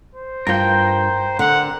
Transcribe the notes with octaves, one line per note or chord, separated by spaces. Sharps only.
C5
G2 F4 A#4 G5
D3 F#5